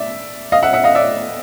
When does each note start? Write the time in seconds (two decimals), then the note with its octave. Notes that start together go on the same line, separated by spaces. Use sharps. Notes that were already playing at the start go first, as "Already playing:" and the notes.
Already playing: D5 E5
0.52 D#5 F5
0.63 E5 F#5
0.73 E5 F#5
0.84 D#5 F5
0.95 D5 E5